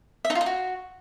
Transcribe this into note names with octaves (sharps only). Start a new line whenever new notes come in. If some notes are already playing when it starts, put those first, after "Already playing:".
E5
D#4
F4
D#4
F#4